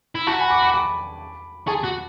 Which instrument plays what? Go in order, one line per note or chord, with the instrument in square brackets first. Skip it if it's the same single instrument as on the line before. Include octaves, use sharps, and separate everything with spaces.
[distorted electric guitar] E4
[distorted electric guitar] F#4 [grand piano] A5 C#6
[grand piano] G#5 B5
B5 D6
B5 D6
B5 D6
[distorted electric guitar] G#4 [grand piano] A5 C#6
[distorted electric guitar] F#4